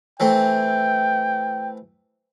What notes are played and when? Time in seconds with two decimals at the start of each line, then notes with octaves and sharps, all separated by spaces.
0.20 E3 A3 C4 G5